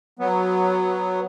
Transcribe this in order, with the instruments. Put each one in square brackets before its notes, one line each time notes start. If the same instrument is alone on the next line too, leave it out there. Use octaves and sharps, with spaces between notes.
[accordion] F#3 B3